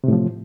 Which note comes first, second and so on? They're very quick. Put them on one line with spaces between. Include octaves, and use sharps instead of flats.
C3 A2 F3